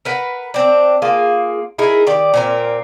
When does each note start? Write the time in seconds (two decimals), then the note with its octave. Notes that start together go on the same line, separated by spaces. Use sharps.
0.05 A#4 B4 F#5
0.54 C4 D4
1.02 A#3 F4 G#4
1.78 D#4 E4 G#4 A#4
2.07 D#3 G4 D5
2.34 A#2 C4 A#4